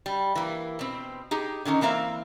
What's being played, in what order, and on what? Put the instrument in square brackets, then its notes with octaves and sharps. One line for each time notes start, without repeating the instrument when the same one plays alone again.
[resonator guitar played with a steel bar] G3
E3 A#3
B2 C4
D#4 G4 G#4
D3 D#3 C#4 D#4
E3 A#3 C4 E5 F5